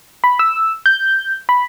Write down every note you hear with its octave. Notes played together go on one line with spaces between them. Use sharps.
B5
E6
G6
B5